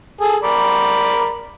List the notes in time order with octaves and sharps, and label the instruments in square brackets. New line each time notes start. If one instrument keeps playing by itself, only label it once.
[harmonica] G#4 A4
A#4 D5 B5